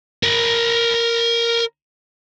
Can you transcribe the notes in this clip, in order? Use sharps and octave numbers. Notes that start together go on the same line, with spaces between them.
A#4 B5